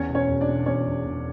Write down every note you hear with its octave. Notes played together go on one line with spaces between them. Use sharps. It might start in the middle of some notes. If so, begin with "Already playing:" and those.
Already playing: E2 C#4 C#5
E1
C#4 C#5
E1
D4 D5
B2
E2 C#4 C#5
E1
E1